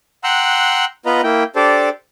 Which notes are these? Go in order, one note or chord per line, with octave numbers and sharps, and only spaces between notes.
F#5 G5 A#5 C6 E6 F#6
B3 F4 B4 D#5 A#5
A#3 E4 G5
D4 G4 A4 C5 D5